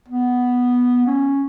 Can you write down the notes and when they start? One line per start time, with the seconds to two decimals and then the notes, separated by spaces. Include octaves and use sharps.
0.08 B3
1.07 C#4